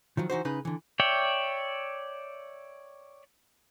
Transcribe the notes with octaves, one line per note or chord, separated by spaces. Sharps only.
D#3 F3 F#3
E3 D#4 F#4 C5
C#3 D#4 B4
D3 E3
C#5 D5 E5 G5